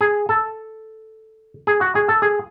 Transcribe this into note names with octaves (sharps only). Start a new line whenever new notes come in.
G#4
A4
G#4
F#4
G#4
A4
G#4